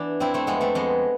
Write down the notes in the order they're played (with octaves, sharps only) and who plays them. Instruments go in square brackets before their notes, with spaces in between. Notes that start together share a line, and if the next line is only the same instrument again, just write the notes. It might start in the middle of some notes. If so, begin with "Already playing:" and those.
Already playing: [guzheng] E3 B3 D4
F2 C4 E4
A3 C4
F2 G#3 B3
A3 C4
F2 G#3 B3